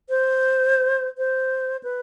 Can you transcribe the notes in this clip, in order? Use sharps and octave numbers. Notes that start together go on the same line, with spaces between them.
C5
C5
B4